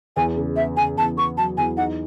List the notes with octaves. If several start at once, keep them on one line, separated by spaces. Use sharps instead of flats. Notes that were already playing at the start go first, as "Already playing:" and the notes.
E2 G#5
C#3
B3 E5
C#3 G#5
E2 A5
B3 C#6
F#3 A5
E2 G#5
D#4 F#5